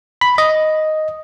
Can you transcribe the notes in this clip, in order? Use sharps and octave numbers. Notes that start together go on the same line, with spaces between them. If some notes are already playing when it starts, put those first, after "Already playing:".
B5
D#5